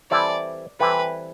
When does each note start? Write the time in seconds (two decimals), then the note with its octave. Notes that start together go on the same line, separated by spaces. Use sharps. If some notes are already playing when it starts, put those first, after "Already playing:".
0.11 E3 G3 C4 E4 A4 D5
0.80 E3 G3 C4 E4 A4 B4